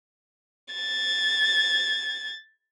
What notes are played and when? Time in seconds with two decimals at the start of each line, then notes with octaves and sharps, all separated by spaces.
0.74 G#6 A6